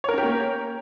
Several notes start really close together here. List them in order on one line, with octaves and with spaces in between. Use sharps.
C#5 A#4 C#4 G4 A#3